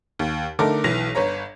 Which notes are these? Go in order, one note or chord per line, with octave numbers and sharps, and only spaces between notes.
D#2
D3 A3 D#4 A4 A#4 D6
B1 E3 A#6 F7
G1 B4 C#5 A#5